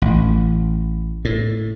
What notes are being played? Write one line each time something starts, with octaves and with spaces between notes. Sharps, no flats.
A1
A2